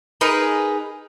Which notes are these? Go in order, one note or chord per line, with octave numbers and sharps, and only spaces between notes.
D#4 G#4 A#4 B4